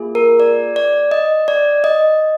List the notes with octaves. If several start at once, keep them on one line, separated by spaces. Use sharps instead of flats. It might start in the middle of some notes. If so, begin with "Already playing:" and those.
Already playing: A#3 F4 G#4
A#4
D5
D5
D#5
D5
D#5